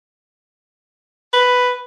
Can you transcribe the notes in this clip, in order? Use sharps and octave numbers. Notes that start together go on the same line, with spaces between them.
B4